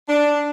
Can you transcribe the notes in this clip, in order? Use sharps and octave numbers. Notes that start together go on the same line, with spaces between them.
D4